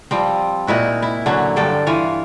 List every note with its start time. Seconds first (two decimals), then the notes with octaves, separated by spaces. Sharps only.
0.11 F3 G3 C4
0.67 A#2 D#4 E4 F#4
1.02 E4
1.26 D3 F#3 C#4
1.56 G2 D3 A4 G5
1.87 E3 F4 C#5